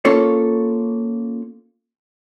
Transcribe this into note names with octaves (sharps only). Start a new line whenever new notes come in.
A#3 C#4 F4 A4 C#5